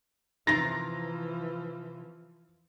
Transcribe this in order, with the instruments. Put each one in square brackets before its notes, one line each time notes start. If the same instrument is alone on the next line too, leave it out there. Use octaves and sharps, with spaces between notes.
[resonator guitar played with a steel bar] C3 A#5 [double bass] E3 F3 [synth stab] D#4 C6 A6 [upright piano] A#6